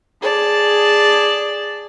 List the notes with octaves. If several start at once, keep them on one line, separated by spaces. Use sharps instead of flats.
G#4 D5 A5